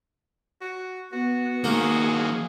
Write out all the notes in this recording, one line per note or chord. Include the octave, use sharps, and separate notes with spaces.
F#4
B3 F#4
D#3 F3 A#3 G#4